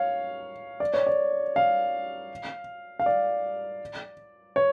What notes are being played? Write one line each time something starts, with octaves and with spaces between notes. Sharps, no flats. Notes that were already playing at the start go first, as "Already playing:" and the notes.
Already playing: C#5 F5
D5
C#5
D5
F5
F5
D5
C#5